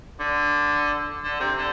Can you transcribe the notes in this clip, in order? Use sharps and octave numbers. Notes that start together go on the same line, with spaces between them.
D3
D3
C3
D3